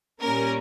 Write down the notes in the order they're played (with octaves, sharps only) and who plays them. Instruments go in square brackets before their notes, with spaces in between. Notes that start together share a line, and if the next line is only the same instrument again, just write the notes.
[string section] A#2 G3 A#3 C#4 A#4